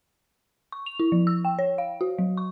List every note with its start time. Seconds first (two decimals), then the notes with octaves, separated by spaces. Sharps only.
0.72 C#6
0.86 F7
0.99 E4
1.12 F3
1.27 E6
1.45 G5
1.59 C#5
1.78 F5
2.01 F#4
2.19 F#3
2.37 C#6